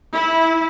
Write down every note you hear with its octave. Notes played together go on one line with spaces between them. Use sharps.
E4